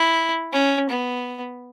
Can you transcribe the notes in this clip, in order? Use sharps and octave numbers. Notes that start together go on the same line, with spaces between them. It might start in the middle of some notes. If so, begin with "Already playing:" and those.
Already playing: E4
C#4
B3